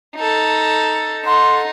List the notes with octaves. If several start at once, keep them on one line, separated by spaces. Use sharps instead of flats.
D#4 A4
D#4 A4 F#5 C6